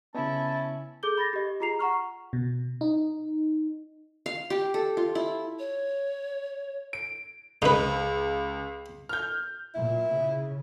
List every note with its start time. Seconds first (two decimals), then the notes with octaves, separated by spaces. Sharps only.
0.15 C#3 B3 C#4 E4 A5
1.03 G#4 A4 D6 G6 G7
1.18 B5 A6 A#6
1.33 G4 D#5
1.60 F4 G#4 A#5 C7 F7
1.79 F#5 A#5 C#6 F6
2.33 B2
2.81 D#4
4.26 F5
4.50 G4
4.74 A4
4.97 F4
5.15 E4
5.59 C#5
6.93 D7
7.62 C#2 D#4 B4
9.09 F6 G6
9.75 A#2 E4
10.15 C#3